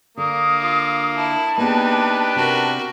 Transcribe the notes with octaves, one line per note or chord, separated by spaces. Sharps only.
D3 A#3 D#6
F4
E4 A5
A#3 B3 D4 D#4 G4 G#4 B4
C3 F#4 A#4